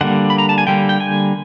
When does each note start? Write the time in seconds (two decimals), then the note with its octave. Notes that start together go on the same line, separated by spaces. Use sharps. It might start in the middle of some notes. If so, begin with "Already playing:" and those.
0.01 D3 G3 A#3 F#5
0.30 B5
0.38 A#5
0.49 A5
0.58 G#5
0.67 D3 G3 A#3 G5
0.89 G5
1.00 G#5